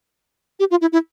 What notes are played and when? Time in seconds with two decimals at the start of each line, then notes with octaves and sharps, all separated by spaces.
0.60 G4
0.71 F4
0.81 E4
0.92 E4